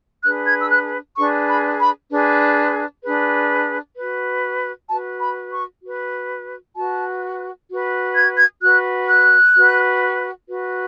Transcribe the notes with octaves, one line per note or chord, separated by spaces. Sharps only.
D4 G#4 B4 F#6
G#6
E6
F#6
D4 G#4 B4 C#6
B5
B5
D4 G#4 B4
D4 G#4 B4
F#4 B4
F#4 B4 A5
B5
C#6
F#4 B4
F#4 B4 A5
F#4 B4
G#6
G#6
F#4 B4 F#6
F#6
F#4 B4
F#4 B4